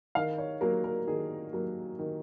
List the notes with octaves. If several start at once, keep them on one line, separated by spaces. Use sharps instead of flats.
D#3 F5
C#5
F#3 A#3 A#4
A#4
D#3 G#4
F#3 A#3
D#3